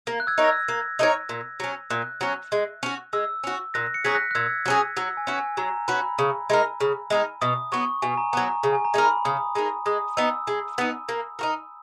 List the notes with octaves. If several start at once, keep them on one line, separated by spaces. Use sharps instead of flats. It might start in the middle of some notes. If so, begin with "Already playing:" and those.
A#3
F#6
E6 G#6
D#4 A#4 C#5
A#6
E6 G#6
A#3
D#4 A#4 C#5
A#2
F#3 C#4
A#2 F#6
F#3 C#4
G#3
C#4 F#4
G#3 E6
C#4 F#4
A#2 F#6 A#6
C#7
F#3 C#4 G#4 B6
F#6 A#6
F#6
A#2 E6 G#6
F#3 C#4 G#4
F#3 E6
G#5
C#4 F#4 B4
G#5
F#3 A#5
C#4 F#4 B4 B5
C#3
G#3 D#4 A#4
C#3
G#3 D#4 A#4
B2 D#6
F#3 B3 C#6
B2 G#5
A#5
F#3 B3 A#5
A#5
C#3
G#5
A#5
G#3 D#4 A#4
B5
C#3 D#6
G#3 D#4 A#4
G#3 D#6
B3 D#4 E6
G#3
B3 D#4
A#3
D#4 F#4 A#4